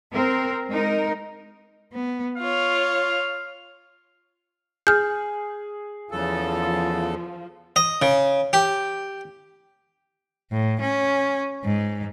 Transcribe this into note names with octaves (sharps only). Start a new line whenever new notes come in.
C4 A#4
G#3 D#4 A#4
B3
F4 C#5 F5
G#4 F6 G6
E2 C#3 F3 A4
D#5
C#3
G4
A2
C#4
G#2